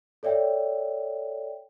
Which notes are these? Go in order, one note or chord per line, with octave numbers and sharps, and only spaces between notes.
A4 C#5 D5 E5 G5